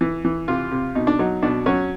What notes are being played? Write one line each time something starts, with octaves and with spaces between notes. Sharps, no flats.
E3
E3
C3 F4
C3
B2 D#4
D4
F#3 D#4
B2 D4
F#3 C#4